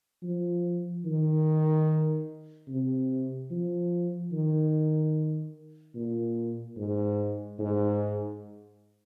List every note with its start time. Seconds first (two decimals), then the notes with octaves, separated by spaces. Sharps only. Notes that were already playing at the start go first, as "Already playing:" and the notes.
0.23 F3
1.05 D#3
2.68 C3
3.50 F3
4.32 D#3
5.95 A#2
6.77 G#2
7.59 G#2